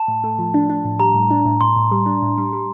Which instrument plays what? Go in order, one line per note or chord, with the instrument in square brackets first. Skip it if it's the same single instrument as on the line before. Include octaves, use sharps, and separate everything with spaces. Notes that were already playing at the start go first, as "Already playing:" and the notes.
Already playing: [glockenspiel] A5
[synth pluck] A2
A3
F3
D4
D4
A2
[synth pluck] G3 [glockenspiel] A#5
[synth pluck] A2
D4
A2
[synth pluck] A2 [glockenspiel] C6
[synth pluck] A2
G3
D4
A2
G3
G3